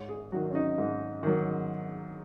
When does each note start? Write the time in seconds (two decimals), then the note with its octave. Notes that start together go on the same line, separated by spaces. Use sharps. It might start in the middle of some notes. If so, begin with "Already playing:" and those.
Already playing: G#2 C#5
0.09 G#4
0.32 D#3 F#3 F#4
0.51 C#4
0.55 D#4
0.78 G#2
1.23 D#3 F#3